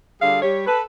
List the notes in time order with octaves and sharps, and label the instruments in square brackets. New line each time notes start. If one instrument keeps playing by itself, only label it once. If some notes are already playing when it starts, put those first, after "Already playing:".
[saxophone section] D3 G3 D4 F4 G#4 F5
G3 G4 C#5
A4 B4